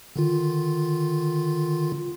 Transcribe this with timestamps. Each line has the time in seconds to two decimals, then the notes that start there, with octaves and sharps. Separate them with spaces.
0.16 D3 D#3 F4